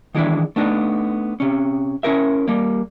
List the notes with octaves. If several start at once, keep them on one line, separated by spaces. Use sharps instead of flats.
D#3 E3 G#3 D4 E4
A3 B3 D4 D#4
C3 C#4
C#4 E4 A#4 E5
G3 A#3